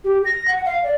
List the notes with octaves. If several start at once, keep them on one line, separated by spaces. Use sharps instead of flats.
G4
A#6
F#5
F5
D5